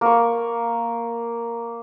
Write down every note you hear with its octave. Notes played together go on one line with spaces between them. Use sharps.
A#3 C#6